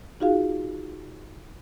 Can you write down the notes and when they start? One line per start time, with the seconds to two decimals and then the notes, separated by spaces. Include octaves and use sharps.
0.20 D#4 F4 F#4 G#4 F5